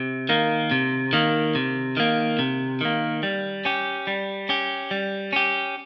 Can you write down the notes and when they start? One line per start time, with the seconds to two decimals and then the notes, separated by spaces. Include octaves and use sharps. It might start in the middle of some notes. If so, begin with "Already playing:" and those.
Already playing: C3
0.29 D#3 A#3
0.71 C3
1.13 D#3 A#3
1.55 C3
1.97 D#3 A#3
2.39 C3
2.81 D#3 A#3
3.23 G3
3.65 C#4 G4
4.07 G3
4.49 C#4 G4
4.91 G3
5.33 C#4 G4